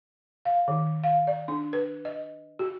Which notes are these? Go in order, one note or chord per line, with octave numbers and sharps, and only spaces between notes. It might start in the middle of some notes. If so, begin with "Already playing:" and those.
F5
D#3
F5
D5
D4
B4
D#5
F#4